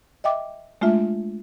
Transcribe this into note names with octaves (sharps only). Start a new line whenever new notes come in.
D#5 E5 G5 D6
G#3 A3 D4 F4 E5